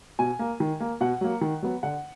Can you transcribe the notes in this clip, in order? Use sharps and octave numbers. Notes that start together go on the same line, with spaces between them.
B2 G#5
A#3
D#3
A#3
B2 F#5
F#3 A#3
D#3
F#3 B3
D3 F#5